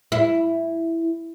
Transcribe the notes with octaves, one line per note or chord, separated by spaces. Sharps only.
E4